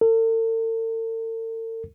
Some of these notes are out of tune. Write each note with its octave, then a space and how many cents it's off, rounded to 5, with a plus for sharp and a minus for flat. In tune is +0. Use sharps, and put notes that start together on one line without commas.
A4 +45